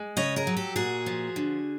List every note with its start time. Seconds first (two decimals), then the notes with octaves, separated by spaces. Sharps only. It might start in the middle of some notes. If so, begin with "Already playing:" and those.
Already playing: G#3
0.17 C#3 C#5 D#5
0.36 G#4 A#4
0.47 F#3
0.57 G4 A4
0.76 A#2 F#4 G#4
1.06 F3
1.36 D3